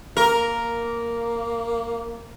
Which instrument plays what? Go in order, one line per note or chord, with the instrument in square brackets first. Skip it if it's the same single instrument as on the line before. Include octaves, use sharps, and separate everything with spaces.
[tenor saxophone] A#3 [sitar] A#4